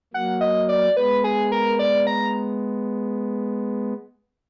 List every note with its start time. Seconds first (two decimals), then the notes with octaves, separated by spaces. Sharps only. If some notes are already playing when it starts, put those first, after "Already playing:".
0.14 F#3 A#3 F#5
0.41 D#5
0.69 D5
0.96 G#3 B3 B4
1.24 G#4
1.52 A#4
1.79 D5
2.07 A#5